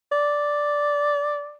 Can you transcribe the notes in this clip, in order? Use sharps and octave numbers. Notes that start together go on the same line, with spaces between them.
D5